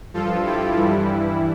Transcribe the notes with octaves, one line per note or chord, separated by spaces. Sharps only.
G2 F3 F4 A4
E4 G4
G2 E3 G3 E4